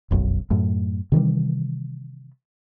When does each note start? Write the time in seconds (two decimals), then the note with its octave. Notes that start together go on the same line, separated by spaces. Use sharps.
0.11 F1 B1 F#2
0.50 F#2 A2
1.12 C3 D#3 E3 G3